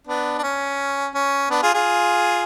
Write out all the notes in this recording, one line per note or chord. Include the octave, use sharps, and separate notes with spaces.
B3 D4
D4
C#4
C#4
B3 D4
F4 G#4
F4 G#4